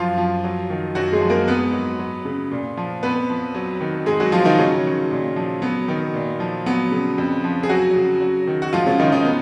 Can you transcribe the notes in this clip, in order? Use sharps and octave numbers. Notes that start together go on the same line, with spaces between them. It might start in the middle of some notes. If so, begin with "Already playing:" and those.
Already playing: F#2 F3 F4
F3
F#3
D#3
F#2 F#3 F#4
G#3 G#4
F3
A#3 A#4
G#2 B3 B4
F#3
F#3
C#3
A#2
F3
F2 B3 B4
F3
F#3
D#3
G#2 G#3 G#4
F#3 F#4
F3 F4
D#3 D#4
C#3 F#3 C#4
D#3
A#2
F3
F#3 B3
D#3
A#2
F3
F#3 B3
C#3
F2
F3
G#4
F#3 F#4
C#3
F#3
D#3
F#4
G#2 F3 F4
C#3 C#4
D#3 F3 D#4
D#3 D#4
B3